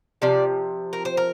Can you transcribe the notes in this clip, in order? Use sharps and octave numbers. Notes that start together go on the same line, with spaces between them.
C3 F3 D5
A#4
C5
A#4